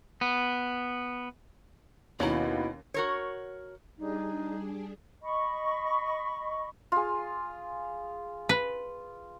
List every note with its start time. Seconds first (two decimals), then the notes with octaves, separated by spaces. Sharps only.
0.21 B3
2.20 D#2 B2 C#4 E4 A#5
2.94 F#4 A#4 C#5
3.98 G3 D4 D#4 G#4
5.22 D#5 B5 C#6
6.92 F4 G#4
8.49 B4